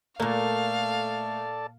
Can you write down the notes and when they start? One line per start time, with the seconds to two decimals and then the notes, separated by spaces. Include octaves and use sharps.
0.20 A#2 A3 A#3 A4 D5 F5 A5